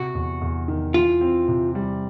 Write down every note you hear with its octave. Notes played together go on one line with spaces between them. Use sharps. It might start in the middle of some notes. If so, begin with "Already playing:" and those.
Already playing: C3 F#4
E2
E2
D#3
E3 F4
C4
C3
G3